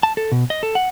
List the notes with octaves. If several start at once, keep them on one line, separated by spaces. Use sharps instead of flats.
A5
A4
B2
D#5
A4
F#5